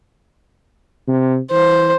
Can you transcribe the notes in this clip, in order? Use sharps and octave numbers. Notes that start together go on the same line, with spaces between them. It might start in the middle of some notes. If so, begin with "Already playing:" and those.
C3
E3 C5